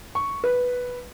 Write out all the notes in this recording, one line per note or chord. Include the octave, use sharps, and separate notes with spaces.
C#6
B4